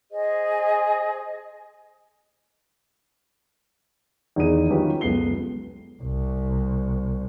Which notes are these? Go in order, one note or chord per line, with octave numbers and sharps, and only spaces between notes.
G#4 C5 D#5
E2 D#3 D#4 G#4 D#7
D#3 F#3 C#4 F4 G4 B4
F#1 C#2 B3 A4 C7 G7
C2